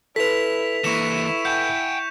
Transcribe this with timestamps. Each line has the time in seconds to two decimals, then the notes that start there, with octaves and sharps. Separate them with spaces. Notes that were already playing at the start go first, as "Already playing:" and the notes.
0.16 E4 A4 B4 B6 F7
0.84 E3 A#3 E4 C#6 C#7 E7
1.45 F#5 G5 G6